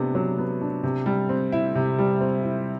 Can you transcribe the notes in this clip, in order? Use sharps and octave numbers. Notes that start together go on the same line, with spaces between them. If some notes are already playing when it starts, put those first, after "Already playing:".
Already playing: C3 B3 D4
F#3
B3
D4
C3
G3
C4
E4
C3
G3
C4
E4